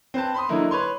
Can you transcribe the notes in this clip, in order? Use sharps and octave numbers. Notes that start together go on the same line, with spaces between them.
C4 B4 A5
B5 C6 D#6
D3 F#3 A#3 D#4 E4
B4 C#5 C6